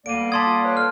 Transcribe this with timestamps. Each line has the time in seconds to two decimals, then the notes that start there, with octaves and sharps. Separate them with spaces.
0.06 D2 D3 G3 A#3 D5 D7 D#7
0.19 B3
0.32 D5 A5 C6 D#6 G#6 A6 B6
0.47 F4
0.65 B4 C#5 D5 G5
0.77 A4 F6